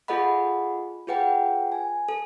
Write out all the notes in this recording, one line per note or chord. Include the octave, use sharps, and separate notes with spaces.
F4 G#4 A4 D#5 F#5 B5
F4 G#4 B4 F#5 G5
G#5
A4